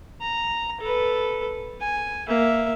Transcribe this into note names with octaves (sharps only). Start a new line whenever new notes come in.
A#5
A4 B4
G#5
A#3 E5